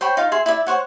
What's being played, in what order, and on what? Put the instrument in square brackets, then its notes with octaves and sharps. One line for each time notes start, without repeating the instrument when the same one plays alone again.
[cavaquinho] C5 C#5 G5 B5
D#4 F4 F5
G#4 E5 C6
E4 D5 E5
C5 C#5 F#5